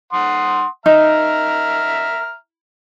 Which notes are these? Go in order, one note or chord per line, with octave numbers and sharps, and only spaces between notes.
F#5 C6 D#6
D#4 E5 A#5 F6